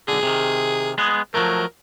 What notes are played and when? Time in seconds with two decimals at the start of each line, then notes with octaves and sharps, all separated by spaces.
0.08 B1 D3 G#4
0.23 C3 D#3
0.98 G#3 B3 G#4
1.34 F3 F#3 A3 A#4